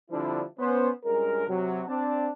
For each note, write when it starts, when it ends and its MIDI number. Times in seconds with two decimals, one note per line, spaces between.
0.11 0.43 50
0.11 0.43 53
0.11 0.43 55
0.11 0.43 60
0.11 0.43 62
0.11 0.43 64
0.59 0.89 59
0.59 0.89 61
0.59 0.89 72
1.05 1.45 43
1.05 1.45 56
1.05 1.45 61
1.05 1.45 65
1.05 1.45 70
1.48 1.82 48
1.48 1.82 54
1.88 2.29 60
1.88 2.29 62
1.88 2.29 81